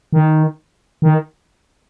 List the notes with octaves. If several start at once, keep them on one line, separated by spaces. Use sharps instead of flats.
D#3
D#3